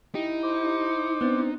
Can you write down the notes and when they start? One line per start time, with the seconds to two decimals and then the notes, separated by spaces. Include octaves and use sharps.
0.15 D#4 E4 G4
0.43 C5 D6
1.21 B3 C4 D4